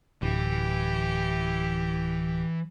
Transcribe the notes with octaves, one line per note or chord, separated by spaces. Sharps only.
D1 E3 G4